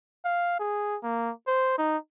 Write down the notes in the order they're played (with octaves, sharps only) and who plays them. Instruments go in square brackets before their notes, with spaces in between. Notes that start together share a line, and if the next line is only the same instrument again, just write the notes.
[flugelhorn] F5
G#4
A#3
C5
D#4